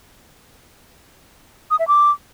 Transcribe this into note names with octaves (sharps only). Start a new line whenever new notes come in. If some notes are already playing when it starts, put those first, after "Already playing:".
D#6
E5
D6